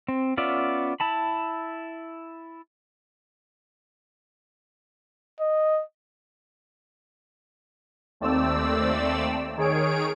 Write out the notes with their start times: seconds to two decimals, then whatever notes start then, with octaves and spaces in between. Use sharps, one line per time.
0.08 C4
0.37 B3 C#4 F4 D5 E5
1.00 E4 A5 B5
5.40 D#5
8.20 D#2 A3 C4 D5 E6
9.57 D#3 G#4 C#5 D7